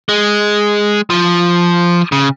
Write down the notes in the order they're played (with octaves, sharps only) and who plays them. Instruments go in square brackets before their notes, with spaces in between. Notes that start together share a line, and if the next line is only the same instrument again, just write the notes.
[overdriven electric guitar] G#3
F3
C#3